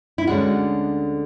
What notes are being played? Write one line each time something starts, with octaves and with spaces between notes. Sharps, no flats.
E4
D2 D3 G#3 C#4 F#4